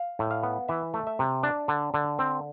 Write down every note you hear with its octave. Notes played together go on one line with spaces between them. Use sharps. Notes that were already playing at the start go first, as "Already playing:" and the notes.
Already playing: F5
A2
F5
B3
E3 E5
A3
E5
C3
D4
D3
D3
C4